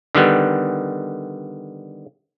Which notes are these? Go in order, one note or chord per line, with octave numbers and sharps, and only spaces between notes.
D3 D#3 G3 B3